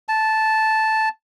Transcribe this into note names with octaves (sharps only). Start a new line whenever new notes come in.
A5